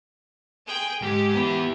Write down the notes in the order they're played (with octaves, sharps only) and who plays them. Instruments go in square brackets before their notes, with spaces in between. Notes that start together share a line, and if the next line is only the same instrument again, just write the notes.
[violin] G#4 G5
[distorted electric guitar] G#2 [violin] G4
[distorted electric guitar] B3 E4